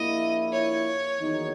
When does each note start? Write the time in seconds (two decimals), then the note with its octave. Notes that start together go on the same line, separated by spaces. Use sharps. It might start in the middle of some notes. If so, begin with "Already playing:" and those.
Already playing: A#1 A#2 A#3 E4 D#5
0.52 C#5
1.19 E2 D#3 F#3 A#3 D#4